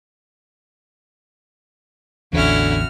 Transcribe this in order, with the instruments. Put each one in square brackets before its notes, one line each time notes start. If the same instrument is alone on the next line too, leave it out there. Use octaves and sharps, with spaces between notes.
[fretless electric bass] A1 E2 [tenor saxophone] D3 [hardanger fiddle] C#4 E4 [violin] F#4 F6